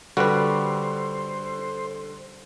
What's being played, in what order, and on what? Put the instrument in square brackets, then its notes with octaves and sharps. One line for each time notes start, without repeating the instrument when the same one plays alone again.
[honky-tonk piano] D3 [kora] G3 [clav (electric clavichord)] F#4 B4 [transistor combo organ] C5